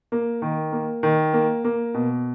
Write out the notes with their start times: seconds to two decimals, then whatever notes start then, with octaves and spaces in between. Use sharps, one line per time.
0.12 A#3
0.42 D#3
0.72 A#3
1.03 D#3
1.33 A#3
1.64 A#3
1.94 B2